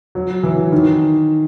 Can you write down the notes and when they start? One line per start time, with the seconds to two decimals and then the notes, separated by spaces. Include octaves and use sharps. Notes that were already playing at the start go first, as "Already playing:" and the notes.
0.15 F#3
0.43 E3
0.72 D#3